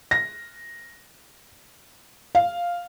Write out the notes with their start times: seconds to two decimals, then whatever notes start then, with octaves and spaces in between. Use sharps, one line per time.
0.11 A#6
2.35 F5